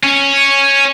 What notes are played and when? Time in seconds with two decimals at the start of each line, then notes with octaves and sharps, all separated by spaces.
0.04 C#4